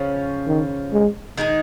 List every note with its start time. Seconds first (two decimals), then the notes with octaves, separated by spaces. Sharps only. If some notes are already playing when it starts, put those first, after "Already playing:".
Already playing: C#3 F3 C#4
0.47 D#3
0.92 G#3
1.37 D#3 G#3 D#4 G#4